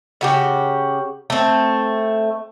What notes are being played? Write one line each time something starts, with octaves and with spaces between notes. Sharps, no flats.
C#3 F#4 G4
A3 C4